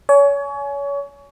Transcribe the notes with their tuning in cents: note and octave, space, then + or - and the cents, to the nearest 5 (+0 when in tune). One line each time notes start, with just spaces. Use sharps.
C#5 +30 G#5 +25